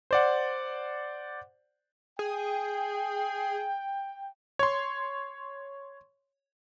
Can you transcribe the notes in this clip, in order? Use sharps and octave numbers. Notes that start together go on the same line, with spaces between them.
C5 D5 F#5
G#4 G5
C#5 C6